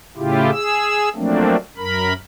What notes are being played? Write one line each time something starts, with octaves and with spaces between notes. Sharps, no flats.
A2 C#3 E4 F4 G4
G#4 E6
F3 F#3 A3 A#3 C4 D4
F#2 A#4 B5